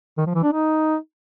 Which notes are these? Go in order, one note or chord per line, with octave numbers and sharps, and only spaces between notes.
D#3
F3
E3
D4
D#4